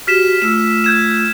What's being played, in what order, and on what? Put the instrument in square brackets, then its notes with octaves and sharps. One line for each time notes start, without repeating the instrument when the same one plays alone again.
[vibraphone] F#4 G4 [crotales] F6 B6 E7
[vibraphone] A3 F4 E6 [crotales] E7
[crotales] G6 G#6 E7